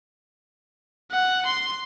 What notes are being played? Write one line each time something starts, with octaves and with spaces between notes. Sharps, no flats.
F#5
C6